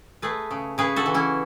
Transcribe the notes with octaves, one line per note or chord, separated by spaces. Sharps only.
A3 G#4 B4
C#3
C#3 G#4 B4
F#4 A4
E3
C#4 E4